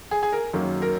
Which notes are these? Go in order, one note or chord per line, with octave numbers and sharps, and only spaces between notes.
G#4
G#4
A#4
F#2 D#3 F#3 A#3
A#4